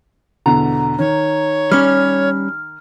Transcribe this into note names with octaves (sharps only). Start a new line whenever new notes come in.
E2 B2 D3 A#5
D#3 C#5
G3 C#4 F6